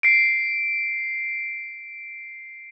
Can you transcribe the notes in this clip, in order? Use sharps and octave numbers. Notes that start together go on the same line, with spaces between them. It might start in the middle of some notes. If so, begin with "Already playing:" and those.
C7 D7